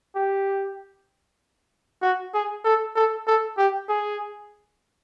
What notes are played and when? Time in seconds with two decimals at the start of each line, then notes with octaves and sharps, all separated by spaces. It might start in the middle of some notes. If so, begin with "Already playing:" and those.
0.15 G4
2.02 F#4
2.34 G#4
2.65 A4
2.95 A4
3.27 A4
3.58 G4
3.89 G#4